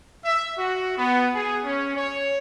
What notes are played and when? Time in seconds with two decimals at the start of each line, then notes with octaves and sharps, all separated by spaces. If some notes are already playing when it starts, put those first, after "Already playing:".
0.24 E5
0.57 F#4
0.97 B3
1.34 G#4
1.64 C#4
1.95 C#5